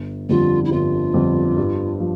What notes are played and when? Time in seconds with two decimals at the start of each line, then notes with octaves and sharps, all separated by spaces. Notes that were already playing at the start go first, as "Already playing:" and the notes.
Already playing: G1
0.29 F2 D3 G3 F4
0.64 E4
0.71 G1 F4
1.14 F2 D3 G3
1.56 G2
2.00 F3